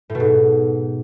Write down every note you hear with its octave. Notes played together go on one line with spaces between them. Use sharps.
A2
B2
G#2